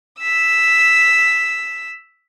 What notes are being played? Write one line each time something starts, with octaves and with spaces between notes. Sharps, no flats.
E6 B6